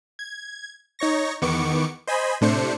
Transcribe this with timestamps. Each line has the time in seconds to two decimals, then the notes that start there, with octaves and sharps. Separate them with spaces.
0.19 G#6
0.99 D#4 C#5 C#6 A#6
1.42 E2 D#3 B3 C#6 D6 C#7
2.07 C5 D#5 G#5 B5
2.41 A2 C3 A3 D4 C5 C#7